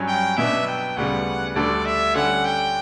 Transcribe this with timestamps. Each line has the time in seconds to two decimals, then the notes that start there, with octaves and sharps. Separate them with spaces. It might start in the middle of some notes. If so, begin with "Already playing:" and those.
Already playing: G2 F#3 C#4
0.08 G5
0.37 B2 F#3 B3 D4 E5
0.67 G5
0.97 D2 C#3 G3 B3 F#5
1.55 D2 D3 G3 D4 A4 D5
1.85 E5
2.15 D3 G3 C#4 F#5
2.45 G5